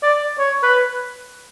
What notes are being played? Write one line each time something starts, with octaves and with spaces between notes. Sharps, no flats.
D5
C#5
B4